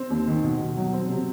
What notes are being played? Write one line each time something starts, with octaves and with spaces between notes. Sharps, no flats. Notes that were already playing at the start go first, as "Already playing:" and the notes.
Already playing: C4
D#2
D#3
B2
B2
F#3
C4
C3